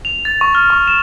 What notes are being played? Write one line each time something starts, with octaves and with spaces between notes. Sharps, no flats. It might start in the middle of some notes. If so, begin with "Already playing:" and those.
F7
A6
C#6
F6
C#6
E7